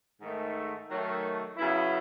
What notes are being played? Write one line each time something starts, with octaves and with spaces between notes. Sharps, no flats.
G#2 D#3 A3
D#3 F#3 A3
C#3 F#3 B3 E4